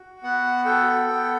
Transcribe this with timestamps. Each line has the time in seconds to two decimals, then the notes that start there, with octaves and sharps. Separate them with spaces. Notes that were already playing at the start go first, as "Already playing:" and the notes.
Already playing: F#4
0.23 B3 F#5
0.65 A4 G5
1.07 B3 G5